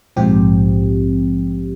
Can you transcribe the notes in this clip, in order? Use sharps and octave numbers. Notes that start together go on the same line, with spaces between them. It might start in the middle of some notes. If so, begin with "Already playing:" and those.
A#1 G#2 F3 C4 G4